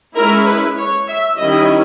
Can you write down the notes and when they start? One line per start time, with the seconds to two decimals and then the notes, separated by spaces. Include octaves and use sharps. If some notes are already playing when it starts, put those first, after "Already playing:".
0.15 G#3 C#4 E4 A#4
0.46 B4
0.77 C#5
1.07 E5
1.38 D#3 G3 C#4 E4 D#5